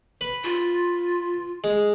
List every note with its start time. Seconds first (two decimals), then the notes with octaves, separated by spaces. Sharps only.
0.21 B4
0.44 F4
1.64 G#3